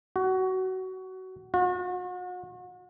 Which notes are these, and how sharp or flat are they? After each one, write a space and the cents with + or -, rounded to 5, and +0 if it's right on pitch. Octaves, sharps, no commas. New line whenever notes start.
F#4 +20
F#4 -40